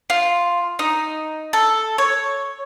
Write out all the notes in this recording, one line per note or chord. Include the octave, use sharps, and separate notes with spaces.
F4
D#4
A4
C#5